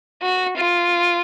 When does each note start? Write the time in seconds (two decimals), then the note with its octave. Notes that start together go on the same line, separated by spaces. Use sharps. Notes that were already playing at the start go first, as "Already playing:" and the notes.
0.22 F#4
0.57 F4